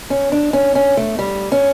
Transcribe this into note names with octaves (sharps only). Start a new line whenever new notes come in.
C#4
D4
C#4
C#4
A3
G3
C#4